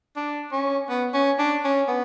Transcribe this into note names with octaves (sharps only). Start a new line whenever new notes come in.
D4
C#4
B3
C#4
D4
C#4
B3